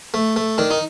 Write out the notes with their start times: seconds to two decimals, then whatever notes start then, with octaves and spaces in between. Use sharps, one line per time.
0.14 A3
0.36 A3
0.58 D#3 D4
0.71 D#4